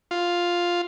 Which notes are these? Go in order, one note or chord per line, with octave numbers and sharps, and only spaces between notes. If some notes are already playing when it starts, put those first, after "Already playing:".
F4